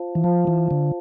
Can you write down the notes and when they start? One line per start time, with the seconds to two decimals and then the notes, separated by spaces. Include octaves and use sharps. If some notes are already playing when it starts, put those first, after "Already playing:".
Already playing: F4 C5 F5 A5
0.15 E3
0.24 F3 F4 C5 F5 A5
0.47 E3
0.71 D3